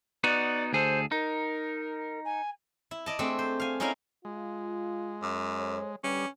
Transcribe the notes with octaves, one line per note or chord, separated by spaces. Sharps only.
B3 D#4 F#4 D5
D2 G#4 A4 C5
D#4 A#4
G#5
E4
D5 D#5 A5
A3 C4 D4 G#4 A4
C5
F5 G#5
C#4 D#4 E4 A#4 F5 G#5
G#3 F4
F#2
A4 C5 C#5
D3 G3 C#4 G4 B4